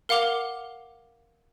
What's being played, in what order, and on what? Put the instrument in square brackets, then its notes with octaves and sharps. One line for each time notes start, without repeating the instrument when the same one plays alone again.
[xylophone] A#4 F5 F#5 D6 F7 G7